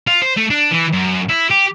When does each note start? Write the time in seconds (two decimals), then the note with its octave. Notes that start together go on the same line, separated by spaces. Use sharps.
0.07 F4
0.22 C5
0.37 A3
0.50 D4
0.71 E3
0.92 F#2
1.29 E4
1.51 G4